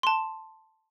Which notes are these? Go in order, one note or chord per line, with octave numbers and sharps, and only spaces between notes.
A5 C6